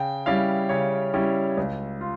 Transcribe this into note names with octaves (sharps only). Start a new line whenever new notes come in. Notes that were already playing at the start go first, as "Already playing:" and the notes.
Already playing: C#3 G5
G3 C#4 E4 F5
C#3 C#5
G3 C#4 E4
C#2
F4